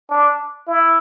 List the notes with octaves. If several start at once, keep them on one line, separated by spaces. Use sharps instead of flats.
D4
E4